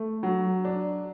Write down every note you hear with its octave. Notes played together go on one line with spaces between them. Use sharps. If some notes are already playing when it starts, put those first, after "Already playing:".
Already playing: A3
F#3
D4